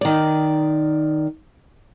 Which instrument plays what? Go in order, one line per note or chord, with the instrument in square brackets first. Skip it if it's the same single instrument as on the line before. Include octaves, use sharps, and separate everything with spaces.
[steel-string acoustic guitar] D#3 D5